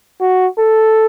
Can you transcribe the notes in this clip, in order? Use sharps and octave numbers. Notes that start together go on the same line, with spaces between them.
F#4
A4